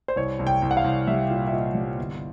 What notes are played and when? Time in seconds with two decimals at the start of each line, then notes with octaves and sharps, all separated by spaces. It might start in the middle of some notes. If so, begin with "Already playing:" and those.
0.08 C5
0.16 C2 C#5
0.39 C2
0.47 G5
0.62 C2
0.71 F#5
0.77 F5
0.84 C2
1.07 G3 E5
1.30 A#2
1.47 E5
1.53 A#2 D#5
1.75 G3
1.98 G1